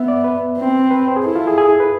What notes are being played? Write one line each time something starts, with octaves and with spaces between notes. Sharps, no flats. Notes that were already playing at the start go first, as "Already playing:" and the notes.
Already playing: B3 E5
D5
B4
C4
B4
C5
G#4
E4 A4
F4
G#4
G#4
B4